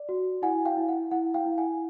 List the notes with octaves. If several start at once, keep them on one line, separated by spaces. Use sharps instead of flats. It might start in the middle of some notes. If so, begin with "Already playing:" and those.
Already playing: D5
F#4
E4 F#5 G#5
F5 G5
E4
F#5
E4 F#5
F5 G5
E4
F#5 G#5